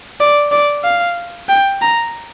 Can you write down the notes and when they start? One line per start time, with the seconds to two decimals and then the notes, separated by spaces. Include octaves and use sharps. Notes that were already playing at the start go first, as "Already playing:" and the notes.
0.20 D5
0.52 D5
0.84 F5
1.49 G5
1.82 A#5